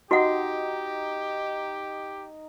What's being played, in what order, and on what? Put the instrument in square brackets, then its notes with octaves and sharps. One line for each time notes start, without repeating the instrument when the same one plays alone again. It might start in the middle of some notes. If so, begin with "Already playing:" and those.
[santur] D#4 [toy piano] F#4 F#5 [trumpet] G4